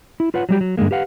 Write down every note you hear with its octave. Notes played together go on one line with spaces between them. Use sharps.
E4
F4 B4 C#5 F#5
F#3 G3 G4
F#3
G2 D3 G#3 A#3
G4 B4 F5 F#5